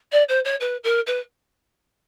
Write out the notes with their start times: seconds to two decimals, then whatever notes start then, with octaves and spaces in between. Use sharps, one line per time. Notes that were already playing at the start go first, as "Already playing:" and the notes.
0.12 D5
0.28 C5
0.45 C#5
0.60 B4
0.83 A#4
1.06 B4